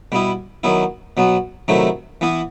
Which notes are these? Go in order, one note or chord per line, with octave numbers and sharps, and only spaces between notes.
B2 G3 B3 E4
D#3 F#3 B3 E4
B2 F#3 B3
C3 D#3 F#3 A3 E4
E3 B3 E4